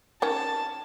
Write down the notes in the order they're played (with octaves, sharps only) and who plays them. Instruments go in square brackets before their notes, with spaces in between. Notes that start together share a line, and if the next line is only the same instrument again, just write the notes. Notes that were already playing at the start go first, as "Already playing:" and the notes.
[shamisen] D#3 C#4 [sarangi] A5